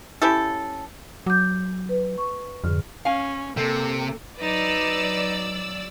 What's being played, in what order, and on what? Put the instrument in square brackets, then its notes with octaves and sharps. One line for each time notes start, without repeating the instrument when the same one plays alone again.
[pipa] C#4 E4 G4 A4
[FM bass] F#3 [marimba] D6 G6
[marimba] B4
C#6
[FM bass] F2 [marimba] G#2 D3 F6
[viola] C#4 [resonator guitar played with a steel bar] F5 G#5
[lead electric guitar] C3 [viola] A#3 A4
[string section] F#3 D5 E6 [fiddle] D#4 B4